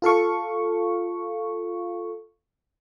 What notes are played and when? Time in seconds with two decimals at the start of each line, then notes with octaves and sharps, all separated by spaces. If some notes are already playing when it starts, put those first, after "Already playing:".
0.02 F4 A4 F5 C#6